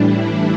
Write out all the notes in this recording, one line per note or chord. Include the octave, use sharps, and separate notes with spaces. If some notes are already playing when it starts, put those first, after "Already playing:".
Already playing: A2 E3 G3 D4 E4